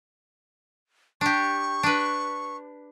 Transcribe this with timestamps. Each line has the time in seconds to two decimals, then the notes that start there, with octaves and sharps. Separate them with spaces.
1.21 D4 G4 C#6
1.83 D4 B4